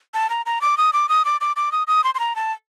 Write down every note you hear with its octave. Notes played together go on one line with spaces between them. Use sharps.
A5
A#5
A#5
D6
D#6
D6
D#6
D6
D6
D6
D#6
D#6
C6
C6
A#5
A5